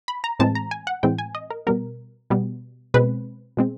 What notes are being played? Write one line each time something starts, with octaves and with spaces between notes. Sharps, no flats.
B5
A#5
A2 E3 G#3 C4 A5
A#5
G#5
F#5
A2 E3 G#3 C4 G5
G#5
D#5
A#4
B2 G3 B3 A#4
B2 G3 B3
B2 G#3 C4 B4
B2 G#3 C4